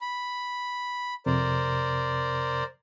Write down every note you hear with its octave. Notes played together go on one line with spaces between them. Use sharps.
B5
F2 C3 A#4 C5 D5